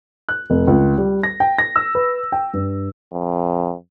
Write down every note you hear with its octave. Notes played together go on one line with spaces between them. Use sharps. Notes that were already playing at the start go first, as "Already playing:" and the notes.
F#6
F1
C#2
G3
A#6
G5
A#6
E6
B4
G5
G2
F2